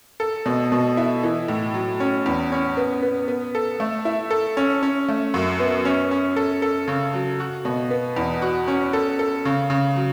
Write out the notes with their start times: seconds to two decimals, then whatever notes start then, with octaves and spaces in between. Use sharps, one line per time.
0.20 A4
0.46 B2
0.72 B2
0.97 E4
1.23 E3
1.48 A2
1.74 F#3
2.00 C#4
2.26 E2
2.52 C#4
2.77 B3
3.02 B3
3.28 B3
3.55 A4
3.80 A3
4.05 E4
4.31 A4
4.57 C#4
4.83 C#4
5.08 A3
5.34 F#2
5.60 B3
5.85 C#4
6.11 C#4
6.36 A4
6.62 A4
6.88 C#3
7.14 F#3
7.40 F#4
7.65 B2
7.91 B3
8.16 E2
8.42 F#4
8.68 C#4
8.93 A4
9.19 A4
9.45 C#3
9.70 C#3
9.96 F#3